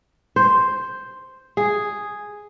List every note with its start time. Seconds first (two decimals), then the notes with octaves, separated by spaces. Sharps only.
0.36 C5
1.57 G#4